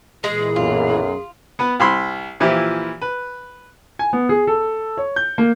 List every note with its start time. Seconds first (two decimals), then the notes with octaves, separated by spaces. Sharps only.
0.24 A#2 E3 G#3 G#4
0.56 B1 F#2 F4
1.59 B3 B4
1.80 C2 B5 C6
2.40 A#2 E3 F3 E4 G4
3.01 B4
3.99 G#5
4.13 B3
4.29 G#4
4.47 A4
4.97 C#5
5.16 G6
5.38 A#3